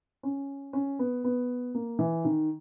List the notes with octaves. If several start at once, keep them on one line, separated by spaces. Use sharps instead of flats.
C#4
C#4
B3
B3
A#3
E3
D#3